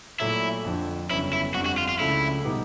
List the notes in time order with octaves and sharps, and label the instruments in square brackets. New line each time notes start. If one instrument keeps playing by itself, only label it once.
[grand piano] A#2 F#3 A3 [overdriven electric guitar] E4
[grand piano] F2 D3 F3
[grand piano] G1 F2 C#3 F#3 B3 [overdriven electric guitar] E4
[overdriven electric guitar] E4
[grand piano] G1 F2 D3 G3 C4 [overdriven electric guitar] F#4
[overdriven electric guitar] F#4
F4
F4
[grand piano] C#2 C#3 F3 A3 D4 [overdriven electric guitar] E4
[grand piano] B2 G3 B3 D#4 G4